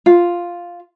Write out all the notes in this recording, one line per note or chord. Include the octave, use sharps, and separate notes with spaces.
F4